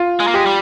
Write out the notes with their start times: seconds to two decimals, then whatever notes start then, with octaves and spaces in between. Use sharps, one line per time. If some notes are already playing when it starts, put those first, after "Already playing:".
Already playing: F4
0.20 G#3
0.28 A#3
0.34 G#3 G4
0.46 G3